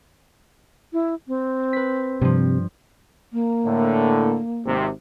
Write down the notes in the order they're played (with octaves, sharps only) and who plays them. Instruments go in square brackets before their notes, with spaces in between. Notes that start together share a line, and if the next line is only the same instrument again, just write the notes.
[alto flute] E4
C4
[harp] B4 B6
[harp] G2 F3 [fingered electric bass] C3
[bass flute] A#3
[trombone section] A2 D3
G#1 C3